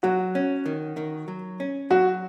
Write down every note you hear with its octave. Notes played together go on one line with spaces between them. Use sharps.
F#3 F#4
C#4
D#3
D#3
F#3
C#4
F#3 F#4